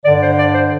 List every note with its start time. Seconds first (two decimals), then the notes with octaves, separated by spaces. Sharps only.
0.04 G2 D3 D5
0.22 C5
0.38 D5
0.54 C5